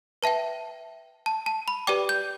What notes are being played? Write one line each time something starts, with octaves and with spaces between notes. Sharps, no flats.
B4 E5 G5 A5
A5
A5
B5
G4 B4 D5 G5 D6
G6